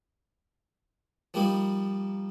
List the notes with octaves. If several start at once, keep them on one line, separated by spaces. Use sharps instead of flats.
F3 G3 A#3 D#4